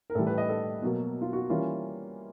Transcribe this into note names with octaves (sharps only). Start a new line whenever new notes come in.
A#4
A2 E3 G3 A4
B4
D#5
A4
B2 F#3 A#3
F4
F#4
E3 G3 A#3 C#4 F4